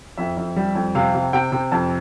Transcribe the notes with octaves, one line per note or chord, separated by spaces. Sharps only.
F2 E5
F2
G3
F2
C3 F5
C3
C3 G5
C3
F2 A5